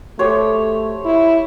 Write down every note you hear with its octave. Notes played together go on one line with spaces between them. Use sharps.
A3 G4 C5 C#5
E4